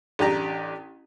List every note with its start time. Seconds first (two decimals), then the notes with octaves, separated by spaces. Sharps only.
0.19 A1 D4 G4 A#5